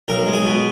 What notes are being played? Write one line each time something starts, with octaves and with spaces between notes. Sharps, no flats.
B1 A#4
G#3
G#4
B2